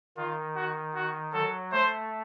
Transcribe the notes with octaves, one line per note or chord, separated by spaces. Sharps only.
D#3 F4
F#4
F#4
F#3 A4
A3 C5